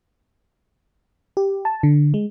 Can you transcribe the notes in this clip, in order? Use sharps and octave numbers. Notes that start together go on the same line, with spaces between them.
G4
A5
D3
G#3